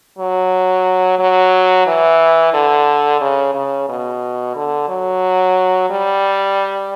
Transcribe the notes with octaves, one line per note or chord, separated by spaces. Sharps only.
F#3
F#3
E3
D3
C#3
C#3
B2
D3
F#3
G3